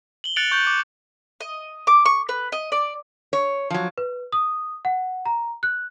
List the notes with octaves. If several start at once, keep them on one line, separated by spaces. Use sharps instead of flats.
F#7 G7
F#6 A6 C#7 D7 F7 F#7
C#6 G6 F#7
D6
D#5
D6
C#6
B4
D#5
D5
C#5
F3 F#3
B4
D#6
F#5
A#5
F#6